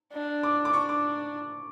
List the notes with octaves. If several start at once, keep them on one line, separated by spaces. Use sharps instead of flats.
D4
D6
D6
D4 C#6
D6